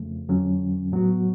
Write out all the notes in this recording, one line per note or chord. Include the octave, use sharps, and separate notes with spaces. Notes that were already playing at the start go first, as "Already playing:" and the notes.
Already playing: F2 C#3 F3 A3
F2 D3 F#3 C#4
A2 F#3 B3 F#4